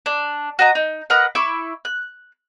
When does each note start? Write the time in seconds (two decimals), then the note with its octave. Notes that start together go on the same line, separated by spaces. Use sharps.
0.06 D4
0.59 F#4 D#5 A#5
0.75 D#4
1.10 A#4 B4 D#5 F#5
1.35 E4 C#6 D6 E6
1.85 F#6